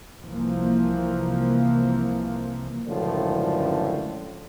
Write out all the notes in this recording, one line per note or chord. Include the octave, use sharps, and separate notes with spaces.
C2 E3 F3 A#3
C#2 F#2 A2 D3 F3